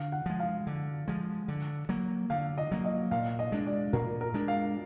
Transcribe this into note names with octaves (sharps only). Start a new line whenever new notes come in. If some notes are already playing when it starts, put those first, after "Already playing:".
Already playing: D3 F5
F#5
F3 G#3
F5
D3
F3 G#3
D3
F#3 A#3
D3 F5
D#5
F#3 A#3
D#5
A#2 F5
D#5
G#3 D4
D5
A#2 A#4
A#4
G#3 D4
F5